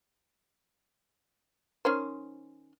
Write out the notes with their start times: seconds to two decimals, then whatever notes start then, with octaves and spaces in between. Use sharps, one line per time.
1.85 D#3 C#4 C5